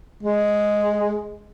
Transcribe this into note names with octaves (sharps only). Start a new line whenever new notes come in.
G#3